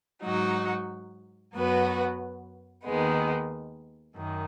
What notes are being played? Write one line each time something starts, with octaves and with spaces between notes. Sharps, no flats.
G#2 F#3 D#4 F#4
F#2 F#3 B3 F#4 B4
D#2 D#3 G#3 B3
F#2 D#3